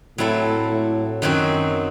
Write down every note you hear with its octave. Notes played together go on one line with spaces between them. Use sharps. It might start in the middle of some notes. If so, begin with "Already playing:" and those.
A2 F#3 C4 E4 A4
A2
F#2 D#3 F#3 C4 F#4